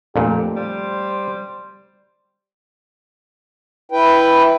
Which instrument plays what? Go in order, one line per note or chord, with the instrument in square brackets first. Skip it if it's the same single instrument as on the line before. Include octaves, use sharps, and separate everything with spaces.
[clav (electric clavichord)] F2 A#2 [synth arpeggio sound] A3 D4 [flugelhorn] G4
[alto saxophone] G3 [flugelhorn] C5
[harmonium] E4 B4 G5